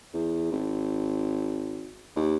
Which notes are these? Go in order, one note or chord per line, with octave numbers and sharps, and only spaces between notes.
E2
G#1
D#2